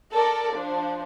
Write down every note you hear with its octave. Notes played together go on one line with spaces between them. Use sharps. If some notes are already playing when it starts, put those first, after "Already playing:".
A4 A#4 D5
F3 D4